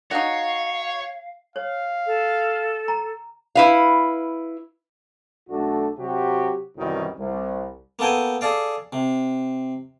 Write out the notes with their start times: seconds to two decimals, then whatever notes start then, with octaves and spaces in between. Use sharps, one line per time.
0.11 D#4 F#4 C#5 F5
1.56 C#5 F5
2.06 A4
2.88 A#5
3.55 E4 B4 F5
5.50 B1 A3 D4 F#4 A4
5.98 C3 F#3 F#4 G4
6.77 C2 F#2 D#3 E3 F#3 G3
7.17 C2
7.99 A#3 B3 A4 G5 G#5
8.41 G#4 A4 D5 F5
8.93 C3